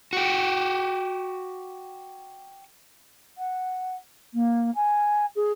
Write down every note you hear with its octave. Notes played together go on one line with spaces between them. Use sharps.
F#4 G4
F#5
A#3
G#5
G#4